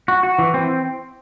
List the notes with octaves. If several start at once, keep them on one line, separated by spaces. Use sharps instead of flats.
F#4
F#4
E3
C4